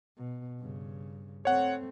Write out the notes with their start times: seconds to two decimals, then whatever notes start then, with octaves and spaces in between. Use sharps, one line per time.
0.17 B2
0.60 G2 C#3
1.45 A3 C4 C#5 F#5